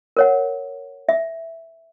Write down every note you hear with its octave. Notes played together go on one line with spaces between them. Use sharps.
A#4 C#5 F#5
E5